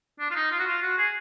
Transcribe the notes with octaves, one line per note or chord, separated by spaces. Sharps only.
D4
F4
D#4
F4
F#4
F4
F#4
G#4